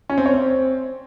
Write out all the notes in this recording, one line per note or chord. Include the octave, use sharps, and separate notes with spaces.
C#4
C4
C#5
C4